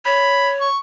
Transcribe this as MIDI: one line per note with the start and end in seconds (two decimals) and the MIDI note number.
0.05 0.67 73
0.05 0.51 83
0.61 0.78 85